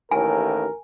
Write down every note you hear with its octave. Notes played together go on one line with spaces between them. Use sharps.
A1 D#2 A2 A#4 G#5